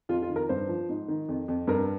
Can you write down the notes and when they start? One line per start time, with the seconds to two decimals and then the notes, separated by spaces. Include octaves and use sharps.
0.09 F2 F4
0.22 F4
0.29 D#3
0.36 A#4
0.49 G2 C5
0.69 F3
0.89 G#2
1.08 D#3
1.29 F2
1.48 F2
1.67 G2 A#4